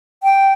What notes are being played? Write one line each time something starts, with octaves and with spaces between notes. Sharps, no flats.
G5